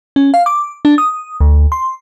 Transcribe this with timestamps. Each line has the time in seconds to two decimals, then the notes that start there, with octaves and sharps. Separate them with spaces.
0.16 C#4
0.34 F5
0.46 D6
0.85 D4
0.98 D#6
1.41 D2
1.72 C6